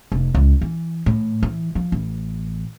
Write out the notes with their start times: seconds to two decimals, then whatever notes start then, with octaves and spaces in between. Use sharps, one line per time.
0.12 F1
0.34 C#2
0.61 E3
1.06 A2
1.43 E3
1.75 F3
1.92 A1